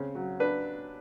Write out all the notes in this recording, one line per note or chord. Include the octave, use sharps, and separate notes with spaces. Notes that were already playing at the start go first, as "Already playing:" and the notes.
Already playing: C#3 C4
F#3
D4 B4